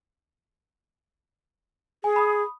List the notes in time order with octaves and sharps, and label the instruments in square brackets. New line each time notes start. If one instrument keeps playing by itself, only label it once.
[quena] G#4 [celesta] G#5
[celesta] B5 D#6